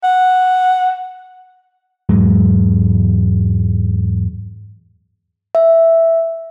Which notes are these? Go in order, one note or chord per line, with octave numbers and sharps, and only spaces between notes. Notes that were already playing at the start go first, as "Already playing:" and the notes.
F#5
E2 G#2 F#3 G#3
E5